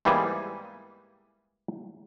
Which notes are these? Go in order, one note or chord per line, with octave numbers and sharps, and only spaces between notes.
G#2 E3 G3 A#3 B3 G#5